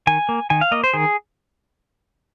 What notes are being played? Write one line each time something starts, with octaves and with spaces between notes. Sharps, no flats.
D#3 G#5
A#3
D#3 G#5
F5
A#3 D#5
C5
D#3 G#4